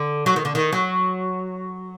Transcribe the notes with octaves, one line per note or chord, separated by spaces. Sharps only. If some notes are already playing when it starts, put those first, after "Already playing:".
Already playing: D3
F#3
D#3
D3
D#3
F#3